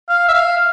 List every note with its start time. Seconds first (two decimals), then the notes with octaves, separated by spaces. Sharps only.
0.09 F5
0.28 E5
0.34 F5